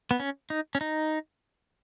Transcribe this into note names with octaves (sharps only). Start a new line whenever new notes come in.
B3
C#4
D#4
C#4
D#4